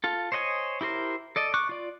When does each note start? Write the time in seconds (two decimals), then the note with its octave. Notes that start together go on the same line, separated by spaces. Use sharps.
0.04 F4 A4
0.32 C5 C#5 D#5 F#5 G#5
0.81 E4 G4 A#4 C5
1.36 A4 D5 D#5
1.54 C#6 D6 F#6
1.69 F4 D5